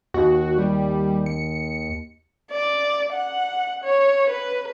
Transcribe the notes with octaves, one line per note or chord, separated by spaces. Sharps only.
D#2 F#4
G3
C#7
D5
F#5
C#5
B4